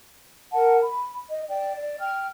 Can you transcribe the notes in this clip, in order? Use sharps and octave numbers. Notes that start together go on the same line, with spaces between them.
A#4 F#5 A5
B5
D#5
D5 G5
D5
G5 F6